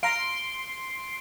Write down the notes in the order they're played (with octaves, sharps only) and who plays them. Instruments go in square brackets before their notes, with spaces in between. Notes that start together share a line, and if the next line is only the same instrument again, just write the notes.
[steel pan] F5 A#5 [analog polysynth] C6 [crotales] D7